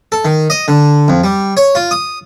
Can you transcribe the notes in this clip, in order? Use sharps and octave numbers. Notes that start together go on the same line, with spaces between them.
A4
D#3
D#5
D3
F2
G3
C#5
F4
D#6